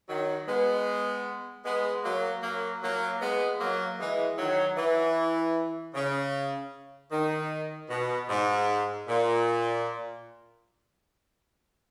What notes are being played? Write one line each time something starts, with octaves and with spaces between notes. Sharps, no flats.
D#3 F#3
G#3 B3
G#3 B3
F#3 A#3
F#3 A#3
F#3 A#3
G#3 B3
F#3 A#3
E3 G#3
D#3 F#3
E3
C#3
D#3
B2
G#2
A#2